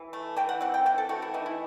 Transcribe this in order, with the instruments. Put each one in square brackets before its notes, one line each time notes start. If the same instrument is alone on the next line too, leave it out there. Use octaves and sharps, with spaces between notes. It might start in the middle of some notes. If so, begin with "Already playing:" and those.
Already playing: [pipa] E3
A3
E3 G5
F#5
C4 F#5
G5
E3 G5
A4
A3 F#4
E4
E3 D#4
E4